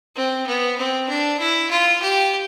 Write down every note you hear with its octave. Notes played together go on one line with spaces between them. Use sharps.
C4
B3
C4
D4
E4
F4
G4